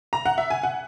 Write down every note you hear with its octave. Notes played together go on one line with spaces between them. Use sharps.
A#5
F#5
E5
G#5
F#5